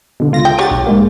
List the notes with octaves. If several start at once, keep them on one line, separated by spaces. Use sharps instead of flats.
B2 D3
C#2 F4 A#6
G5
F#4 G4 C#5 A6
B1
G#2 G#3 A#3